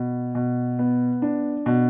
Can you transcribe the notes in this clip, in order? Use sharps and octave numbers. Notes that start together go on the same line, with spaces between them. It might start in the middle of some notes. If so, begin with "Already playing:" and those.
Already playing: B2
B2
B3
D4
B2